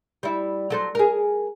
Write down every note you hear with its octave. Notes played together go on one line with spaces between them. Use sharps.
G3 E4
F#3 A4 C5
G#4 A#4